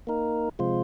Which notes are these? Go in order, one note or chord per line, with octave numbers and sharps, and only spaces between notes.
A#3 D#4 A#4
C3 F3 G#3 F4 C5